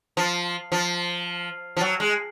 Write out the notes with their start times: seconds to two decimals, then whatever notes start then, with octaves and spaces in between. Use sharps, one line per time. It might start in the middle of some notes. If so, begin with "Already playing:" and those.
0.17 F3
0.72 F3
1.77 F3
1.81 F#3
2.00 G#3